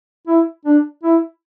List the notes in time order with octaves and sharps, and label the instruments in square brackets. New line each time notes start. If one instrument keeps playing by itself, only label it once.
[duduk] E4
D4
E4